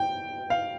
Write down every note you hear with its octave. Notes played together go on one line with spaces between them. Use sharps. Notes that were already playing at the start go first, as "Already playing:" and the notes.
Already playing: G5
F5